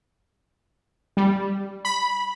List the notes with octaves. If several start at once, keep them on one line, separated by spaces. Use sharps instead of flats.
G3
B5